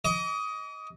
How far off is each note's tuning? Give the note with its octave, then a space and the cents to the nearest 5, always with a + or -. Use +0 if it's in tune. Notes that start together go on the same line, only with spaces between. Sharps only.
D#5 +10 D6 -40